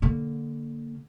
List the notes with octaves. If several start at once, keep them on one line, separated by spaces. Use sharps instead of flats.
D3 A#3